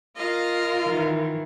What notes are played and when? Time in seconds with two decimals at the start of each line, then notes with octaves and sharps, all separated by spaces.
0.16 F4 A#4 D#5 F5
0.85 D#3 E3